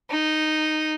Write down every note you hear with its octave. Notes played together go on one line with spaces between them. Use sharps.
D#4